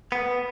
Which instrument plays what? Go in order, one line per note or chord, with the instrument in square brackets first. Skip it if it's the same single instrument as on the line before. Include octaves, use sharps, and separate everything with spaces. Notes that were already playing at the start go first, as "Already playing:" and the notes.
[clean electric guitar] B3